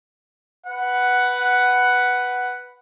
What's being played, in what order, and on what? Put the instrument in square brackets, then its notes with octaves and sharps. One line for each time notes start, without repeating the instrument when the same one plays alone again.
[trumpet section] B4 F#5